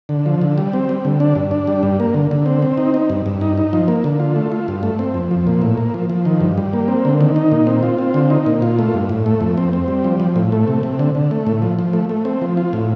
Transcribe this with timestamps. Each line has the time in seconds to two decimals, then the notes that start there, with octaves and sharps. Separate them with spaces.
0.09 D3
0.26 F3
0.41 D3
0.58 G3
0.73 C4
0.89 G3
1.05 D3
1.20 D4
1.35 G2
1.51 D4
1.67 G3
1.83 G2
2.00 A#3
2.14 D3
2.31 D3
2.46 C4
2.62 C4
2.77 D#4
2.94 D#4
3.10 G2
3.26 G2
3.41 D#4
3.58 D#4
3.73 F3
3.88 A#3
4.04 D3
4.20 F4
4.36 A3
4.52 F4
4.68 G2
4.83 A3
4.99 C4
5.14 F2
5.31 F3
5.47 A#2
5.62 A2
5.77 A#3
5.94 F3
6.10 F3
6.25 D#3
6.41 G2
6.58 G3
6.73 A#3
6.88 C4
7.05 D3
7.21 D#3
7.36 D#4
7.52 A#2
7.67 C4
7.83 F4
7.98 C4
8.14 D3
8.30 D#4
8.46 A#2
8.62 F4
8.79 A3
8.94 G2
9.09 A2
9.26 A3
9.41 F2
9.58 C4
9.73 C4
9.88 G3
10.04 F3
10.20 F3
10.36 A2
10.52 A3
10.68 C3
10.83 C3
10.99 D3
11.15 D3
11.31 A3
11.47 A2
11.62 F3
11.79 F3
11.93 A3
12.09 A3
12.25 C4
12.42 F3
12.57 F4
12.73 A2